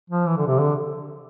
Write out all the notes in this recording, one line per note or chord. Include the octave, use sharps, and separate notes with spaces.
F3
E3
D3
C3
D3